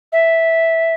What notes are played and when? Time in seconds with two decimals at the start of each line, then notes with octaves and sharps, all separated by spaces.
0.12 E5